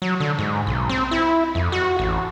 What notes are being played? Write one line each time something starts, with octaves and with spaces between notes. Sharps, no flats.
F#3
D3
G#2
B1
C4
E4
F2
F#4
A1